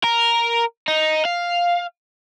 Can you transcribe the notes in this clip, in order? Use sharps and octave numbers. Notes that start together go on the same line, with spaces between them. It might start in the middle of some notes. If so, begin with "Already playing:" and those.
A#4
D#4
F5